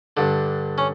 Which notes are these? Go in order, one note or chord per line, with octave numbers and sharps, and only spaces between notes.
G2 D3
C#4